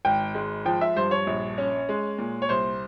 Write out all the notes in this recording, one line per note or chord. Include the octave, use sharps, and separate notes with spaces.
G#1 G5
G#3
F3 G5
E5
G2 C5
C#5
A#1
C#4
G#3
A#2
C#5
C2 C5